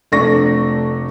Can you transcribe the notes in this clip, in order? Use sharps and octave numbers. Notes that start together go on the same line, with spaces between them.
F1 A3 D4 C#6 A#6